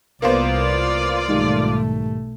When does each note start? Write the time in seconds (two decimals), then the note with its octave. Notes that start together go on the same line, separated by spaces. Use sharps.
0.22 C2 A#3 B3 F4 C5 D5
1.28 B1 G#2 D#3 G3 A3